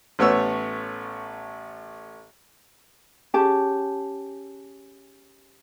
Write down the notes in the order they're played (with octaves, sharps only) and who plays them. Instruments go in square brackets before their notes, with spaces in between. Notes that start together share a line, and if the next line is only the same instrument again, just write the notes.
[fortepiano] A1 A3 B3 C#5 E6
[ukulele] C#4 G4 G#4 A5